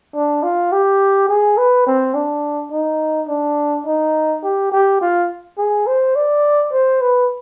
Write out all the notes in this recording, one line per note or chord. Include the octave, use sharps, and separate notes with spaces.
D4
F4
G4
G#4
B4
C4
D4
D#4
D4
D#4
G4
G4
F4
G#4
C5
D5
C5
B4